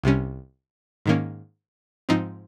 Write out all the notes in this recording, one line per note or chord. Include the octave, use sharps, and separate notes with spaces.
C2 C3 G3 C#4
G#2 D#3 A#3 C#4
G#2 F3 C4 D#4